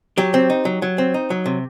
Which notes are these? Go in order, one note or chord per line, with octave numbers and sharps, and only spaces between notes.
F#3 G4
C4
D#4
F#3
F#3
C4
D#4
F#3
C3